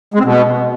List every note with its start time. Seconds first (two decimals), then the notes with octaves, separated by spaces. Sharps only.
0.14 G#3
0.19 C4
0.25 B2